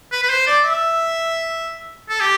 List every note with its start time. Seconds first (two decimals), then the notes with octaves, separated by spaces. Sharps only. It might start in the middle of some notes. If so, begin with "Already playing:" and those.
0.12 B4
0.23 B4
0.30 C5
0.47 D5
0.64 E5
2.09 A4
2.21 G4